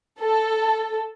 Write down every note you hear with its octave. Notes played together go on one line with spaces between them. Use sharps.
A4